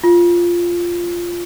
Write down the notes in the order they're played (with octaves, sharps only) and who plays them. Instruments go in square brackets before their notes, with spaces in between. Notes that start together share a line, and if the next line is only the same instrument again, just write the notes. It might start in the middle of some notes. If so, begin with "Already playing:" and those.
[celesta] F4